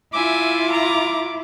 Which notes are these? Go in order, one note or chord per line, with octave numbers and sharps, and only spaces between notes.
E4 F4 E5 G#5 D6
A#5